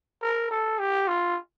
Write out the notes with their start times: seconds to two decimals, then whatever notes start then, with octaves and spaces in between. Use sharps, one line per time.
0.22 A#4
0.51 A4
0.79 G4
1.07 F4